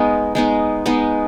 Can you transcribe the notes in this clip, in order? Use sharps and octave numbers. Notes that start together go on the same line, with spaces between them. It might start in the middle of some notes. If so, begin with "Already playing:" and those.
Already playing: G#3 B3 D#4
G#3 B3 D#4
G#3 B3 D#4